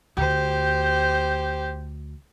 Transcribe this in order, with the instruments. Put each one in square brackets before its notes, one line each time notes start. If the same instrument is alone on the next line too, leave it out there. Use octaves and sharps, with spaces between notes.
[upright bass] D2 [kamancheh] G4 C5